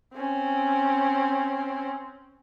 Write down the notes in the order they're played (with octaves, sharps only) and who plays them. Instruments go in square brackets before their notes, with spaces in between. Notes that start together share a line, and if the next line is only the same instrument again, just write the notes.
[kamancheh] C4 C#4